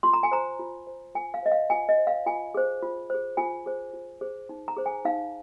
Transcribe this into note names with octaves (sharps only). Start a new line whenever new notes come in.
F4 C6
A#5
G#5
C5 A#5
F4
C5
F4 G#5
F5
C5 D#5
F5
F4 G#5
D#5
C5
F5
F4 G#5
G#4 C5
F4
G#4 C5
F4 G#5
G#4 C5
F4
G#4 C5
D#4
A#5
G#4 C5
G#5
D#4 F5